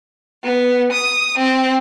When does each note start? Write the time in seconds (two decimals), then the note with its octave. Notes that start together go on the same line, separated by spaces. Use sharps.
0.44 B3
0.92 D#6
1.38 C4